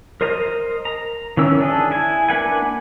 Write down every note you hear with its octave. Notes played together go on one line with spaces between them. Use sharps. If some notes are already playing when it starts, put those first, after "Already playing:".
A#4 C5 D#5 A#5
A#5
D#3 E3 C#4 E6
D4 G#4 A4
E4 G#5
A#3 D4 B4 F#5 G#5